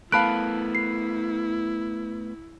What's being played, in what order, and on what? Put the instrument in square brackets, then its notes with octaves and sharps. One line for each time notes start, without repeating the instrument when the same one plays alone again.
[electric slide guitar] A3 B3 [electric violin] E4 [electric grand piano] F5 B5 F#6 [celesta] A5 D7
[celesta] C7